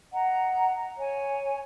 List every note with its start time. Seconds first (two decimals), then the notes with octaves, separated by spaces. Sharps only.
0.12 D#5 F#5 A#5
0.98 C#5 G#5